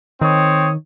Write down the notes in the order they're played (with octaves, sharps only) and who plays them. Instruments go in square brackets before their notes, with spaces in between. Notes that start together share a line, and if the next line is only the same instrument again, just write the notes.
[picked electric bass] D#3 [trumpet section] C4 C#5 D#6